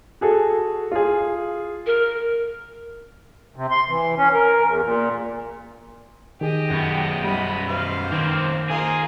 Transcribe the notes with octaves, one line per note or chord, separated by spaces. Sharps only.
F#4 G#4 A4
F4 G#4
A#4
C3
C6
E3
C#4
A#4
E2
A#2
D#3 G4 G#4 D#5
F#2 B3
G3 D#5 B5
B4 C5 F5
D#3 A#3 C4
A#3 D#4 F4 G#4